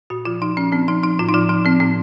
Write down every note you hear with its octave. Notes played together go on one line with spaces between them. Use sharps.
A#2 F#4
F3 F4
F3 D#4
F3 C#4
F3 C4
F3 D#4
F3 D#4
A2 F4
D#4
F3 F4
F3 D#4
F3 C4
A2 C4